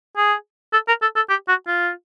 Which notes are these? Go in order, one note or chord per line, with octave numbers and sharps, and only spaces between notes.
G#4
A4
A#4
A4
A4
G4
F#4
F4